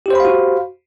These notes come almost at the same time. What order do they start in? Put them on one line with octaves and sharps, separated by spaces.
G4 C5 B5 F5 F#4